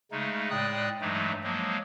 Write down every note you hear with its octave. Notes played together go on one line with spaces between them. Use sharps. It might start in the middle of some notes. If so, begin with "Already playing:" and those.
C#3 G#3 A3 D#4
A2 G#3 D5 G5 D#6 F#6
G2 E3 F#3 G#3 A3 D#4
F3 F#3 G#3 A#3